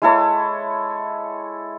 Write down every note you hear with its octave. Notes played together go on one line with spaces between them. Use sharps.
G#3 E4 A4 C#5